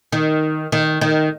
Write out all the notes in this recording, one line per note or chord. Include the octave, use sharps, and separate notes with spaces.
D#3
D#3
D#3